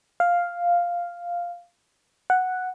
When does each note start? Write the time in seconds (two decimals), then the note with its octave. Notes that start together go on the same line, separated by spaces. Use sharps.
0.20 F5
2.30 F#5